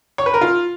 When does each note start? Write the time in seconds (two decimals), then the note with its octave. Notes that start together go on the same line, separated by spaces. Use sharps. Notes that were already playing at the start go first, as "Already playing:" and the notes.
0.18 C#5
0.26 B4
0.34 A#4
0.41 F4